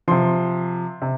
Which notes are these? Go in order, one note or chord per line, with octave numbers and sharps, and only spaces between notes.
C3 F3 C6
C3